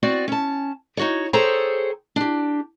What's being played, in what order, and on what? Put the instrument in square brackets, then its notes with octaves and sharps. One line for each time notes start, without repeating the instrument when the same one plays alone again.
[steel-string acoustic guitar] B3 C4 F#4 D5
C#4 A5
D#4 F#4 C#5
G#4 A4 C5 C#5 G5 A#5
D4 G4